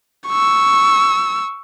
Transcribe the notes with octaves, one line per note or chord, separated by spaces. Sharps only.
C#6 E6